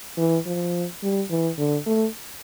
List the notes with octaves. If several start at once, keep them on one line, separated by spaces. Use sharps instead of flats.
E3
F3
G3
E3
D3
A3